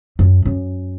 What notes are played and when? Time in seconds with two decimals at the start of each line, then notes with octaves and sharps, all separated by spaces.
0.19 F#2
0.45 F#2